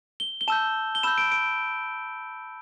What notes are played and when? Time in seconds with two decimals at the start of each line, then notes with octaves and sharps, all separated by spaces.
0.20 G7
0.41 G7
0.48 A5 E6 G6 E7
0.95 G7
1.03 B5 E6 G6 E7
1.18 D7
1.32 D7